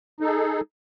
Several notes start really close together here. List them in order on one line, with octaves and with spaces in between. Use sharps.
D#4 A4 G#4